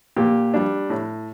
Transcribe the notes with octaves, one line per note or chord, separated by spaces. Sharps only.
A#2 G4
G3 D4
A2